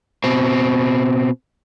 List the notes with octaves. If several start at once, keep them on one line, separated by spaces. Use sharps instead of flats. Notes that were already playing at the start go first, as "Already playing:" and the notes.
B2 C4